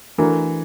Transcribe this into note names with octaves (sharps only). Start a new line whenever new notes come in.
E3 A3 D4 F#4 A#4